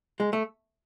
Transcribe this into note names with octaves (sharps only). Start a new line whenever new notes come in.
G#3
A3